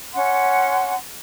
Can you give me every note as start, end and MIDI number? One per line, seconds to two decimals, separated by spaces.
0.12 0.94 61
0.12 0.94 78
0.12 0.94 84